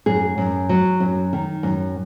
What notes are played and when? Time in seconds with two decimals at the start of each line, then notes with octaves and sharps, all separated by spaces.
0.06 F#2 G#4
0.38 F#2
0.69 F#3
1.00 F#2
1.33 D#3
1.63 F#2